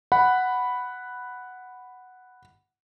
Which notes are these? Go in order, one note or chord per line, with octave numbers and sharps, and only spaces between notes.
F#5 B5